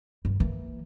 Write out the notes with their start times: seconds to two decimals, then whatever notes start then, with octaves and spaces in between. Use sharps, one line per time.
0.25 G2
0.40 E3 A#3